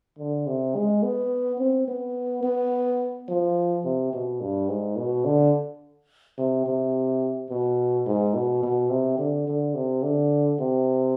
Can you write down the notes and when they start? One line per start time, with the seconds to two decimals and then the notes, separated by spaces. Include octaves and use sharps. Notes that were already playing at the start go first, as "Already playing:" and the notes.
0.19 D3
0.47 C3
0.75 G#3
1.03 B3
1.59 C4
1.88 B3
2.43 B3
3.29 F3
3.84 C3
4.13 B2
4.41 G2
4.69 G#2
4.96 B2
5.25 D3
6.38 C3
6.66 C3
7.50 B2
8.06 G#2
8.34 B2
8.63 B2
8.90 C3
9.18 D3
9.47 D3
9.75 C3
10.03 D3
10.59 C3